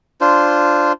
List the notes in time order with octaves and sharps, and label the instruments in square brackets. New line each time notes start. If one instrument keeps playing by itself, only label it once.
[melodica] D4 F4 C5